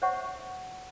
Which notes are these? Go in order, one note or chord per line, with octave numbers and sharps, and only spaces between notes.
C5 C#5 E5 F#5 C#6